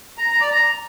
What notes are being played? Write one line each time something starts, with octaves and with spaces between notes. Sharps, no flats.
A#5
A#5
D5
A#5